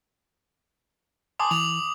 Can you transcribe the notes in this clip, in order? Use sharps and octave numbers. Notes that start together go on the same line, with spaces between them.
G#5 A5 C6 D6 D#6
E3 F7